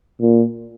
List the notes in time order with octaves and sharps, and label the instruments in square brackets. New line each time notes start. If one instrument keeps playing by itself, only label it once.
[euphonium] A#2